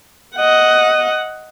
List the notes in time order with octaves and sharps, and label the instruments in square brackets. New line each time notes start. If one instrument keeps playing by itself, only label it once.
[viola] D#5 F#5